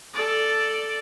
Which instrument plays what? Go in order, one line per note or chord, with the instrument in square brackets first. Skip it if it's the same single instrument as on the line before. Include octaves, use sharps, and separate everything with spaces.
[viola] A4 D5